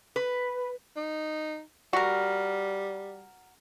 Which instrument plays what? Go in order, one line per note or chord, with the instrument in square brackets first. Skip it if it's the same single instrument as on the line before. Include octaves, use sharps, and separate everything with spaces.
[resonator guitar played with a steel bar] B4
[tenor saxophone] D#4
[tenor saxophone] G3 [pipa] F#4 A#4